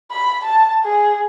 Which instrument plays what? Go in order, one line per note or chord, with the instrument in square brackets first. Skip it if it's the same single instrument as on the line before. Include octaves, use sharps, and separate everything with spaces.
[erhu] B5
A5
G#4